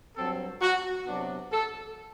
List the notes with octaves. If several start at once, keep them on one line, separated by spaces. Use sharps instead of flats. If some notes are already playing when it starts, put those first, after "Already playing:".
G2 F#3 C4 A4
F#4
C3 F#3 B3 D4
A4